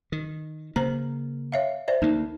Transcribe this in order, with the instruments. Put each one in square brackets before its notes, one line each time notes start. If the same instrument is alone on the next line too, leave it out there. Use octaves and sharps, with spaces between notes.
[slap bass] D#3
[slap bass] C#3 A#3 [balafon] C5 A#5
[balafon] C#5 E5 F5
C5 D5 E5
[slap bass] D2 A#3 [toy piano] D#4